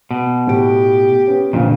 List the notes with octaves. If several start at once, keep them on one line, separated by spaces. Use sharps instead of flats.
B2
A2 G4 D7
B3 C#4
E1 A#1 F2 A#2